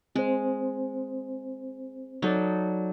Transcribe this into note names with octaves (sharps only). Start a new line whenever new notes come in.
G#3 C4 C5
F#3 D#4 A4 D5